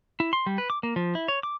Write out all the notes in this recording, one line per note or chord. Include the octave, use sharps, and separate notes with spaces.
E4
C6
G3
B4
D6
A#3
F3
E4
C#5
D6